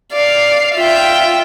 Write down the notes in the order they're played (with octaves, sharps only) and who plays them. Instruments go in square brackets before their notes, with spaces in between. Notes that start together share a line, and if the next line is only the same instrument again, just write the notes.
[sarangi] D5 [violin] F5
[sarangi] F4 [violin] E5 G5